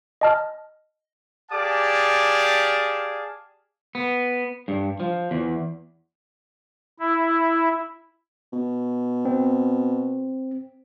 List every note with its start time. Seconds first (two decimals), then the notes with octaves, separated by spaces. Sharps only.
0.21 D#5 A5 F6
1.52 G4 G#4 D5 F5 A5 D6
3.95 B3
4.68 G2
5.00 F3
5.31 E2
6.99 E4
8.52 B2
9.25 C4